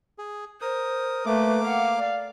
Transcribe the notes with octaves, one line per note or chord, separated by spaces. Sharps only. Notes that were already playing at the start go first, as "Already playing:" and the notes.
G#4
A#4 C5 D#6
A3 A#3 B4 D6
F5 F#5
D5